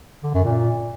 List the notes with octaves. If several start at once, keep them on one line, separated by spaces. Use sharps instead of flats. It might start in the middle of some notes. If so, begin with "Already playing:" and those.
D3
F#2
A#2